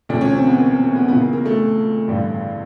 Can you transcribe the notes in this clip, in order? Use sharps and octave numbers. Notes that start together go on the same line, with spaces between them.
E1 D2 D3 F3 D4
C#4
C4
B3
A#3
A#3
A#3
B3
C#2 C#3 E3 B3
A#3
A#3
A3
A1 G2 D3